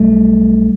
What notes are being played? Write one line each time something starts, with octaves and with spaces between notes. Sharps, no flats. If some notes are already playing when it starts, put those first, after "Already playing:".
Already playing: B1 G3 A3